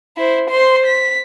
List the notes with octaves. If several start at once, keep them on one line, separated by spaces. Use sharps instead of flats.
E4 C5
C5 C6
B6